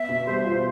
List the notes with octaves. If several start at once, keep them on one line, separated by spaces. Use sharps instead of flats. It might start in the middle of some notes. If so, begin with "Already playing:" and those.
Already playing: B3 E5
B2
G3 C5
F4